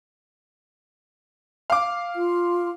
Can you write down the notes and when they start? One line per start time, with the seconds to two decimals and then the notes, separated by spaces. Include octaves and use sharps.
1.70 F5 D6
2.16 F4